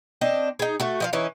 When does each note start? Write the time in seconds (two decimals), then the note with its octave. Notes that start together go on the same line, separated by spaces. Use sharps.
0.21 C4 D4 D#5
0.59 D#4 G#4
0.80 A3 F#4
1.00 F3 D#5 F5
1.13 E3 C#4 D#4